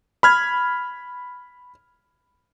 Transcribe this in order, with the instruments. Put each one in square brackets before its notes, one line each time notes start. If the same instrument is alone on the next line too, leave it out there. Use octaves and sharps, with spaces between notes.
[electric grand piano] B5 F6 G#6